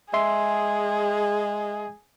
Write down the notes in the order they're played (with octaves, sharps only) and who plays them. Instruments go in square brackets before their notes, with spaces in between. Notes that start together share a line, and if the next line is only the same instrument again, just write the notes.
[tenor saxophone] G#3 [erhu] G#4 [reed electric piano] E5 C6